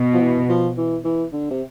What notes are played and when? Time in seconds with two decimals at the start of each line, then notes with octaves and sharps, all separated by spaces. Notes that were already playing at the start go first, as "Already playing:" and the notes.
Already playing: B2
0.13 F3
0.20 E3
0.49 F3
0.77 E3
1.04 E3
1.32 D3
1.50 C3